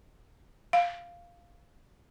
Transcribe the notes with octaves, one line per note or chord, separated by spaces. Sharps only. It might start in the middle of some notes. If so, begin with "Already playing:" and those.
F5